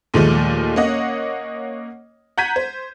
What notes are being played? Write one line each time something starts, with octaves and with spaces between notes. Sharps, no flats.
D#2 A#2 D#3 F3 G#3 A3
A#3 C#4 C#5 D#5 F#5
F#5 A#5 G6 G#6 B6 D#7
C5